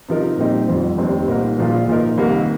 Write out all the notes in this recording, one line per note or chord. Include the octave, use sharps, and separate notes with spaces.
C3 F3 D#4 A#4
A#2 G3 C4 D#4
G1 F2 F3
F1 D#2 D#3 C4
C2 A#2 A#3 D#4 A#4
A#1 A#2 F3 A#3 F4
A#2 F3 D#4 A#4
C2 C3 D#3 A#3